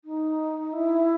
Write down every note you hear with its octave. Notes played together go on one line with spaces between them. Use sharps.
D#4
E4